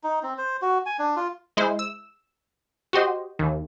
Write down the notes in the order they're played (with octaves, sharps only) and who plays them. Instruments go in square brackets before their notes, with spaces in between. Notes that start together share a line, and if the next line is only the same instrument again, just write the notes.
[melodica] D#4
C4
C5
F#4
G#5
D4
F4
[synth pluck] G#3 E4 C5
E6
F#4 G4 C5 D#5
D#2